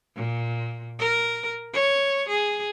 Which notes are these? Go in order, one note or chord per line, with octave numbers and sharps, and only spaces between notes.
A#2
A#4
C#5
G#4